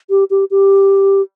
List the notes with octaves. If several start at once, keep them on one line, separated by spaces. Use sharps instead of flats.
G4
G4
G4